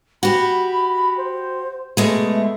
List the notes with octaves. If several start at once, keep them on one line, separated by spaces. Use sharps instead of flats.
F#4 G4 B5
C5
B2 G#3 A3 G#4
E5